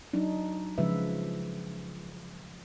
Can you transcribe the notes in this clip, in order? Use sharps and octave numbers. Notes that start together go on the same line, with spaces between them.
F#3 D4 D#4
C#3 F3 G#3 F4 B4 E5